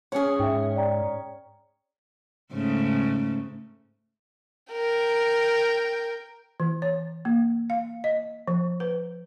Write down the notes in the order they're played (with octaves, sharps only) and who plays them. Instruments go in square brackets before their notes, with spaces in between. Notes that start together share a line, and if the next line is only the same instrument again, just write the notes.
[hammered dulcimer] C#4 C#5 [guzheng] G#4 F#5
[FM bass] G#2 [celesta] E5 G5
[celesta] D5 G5 A#5
[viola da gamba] G#2 C#3 A3
[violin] A#4 G5
[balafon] E3
C#5
A#3
F5
D#5
F3
B4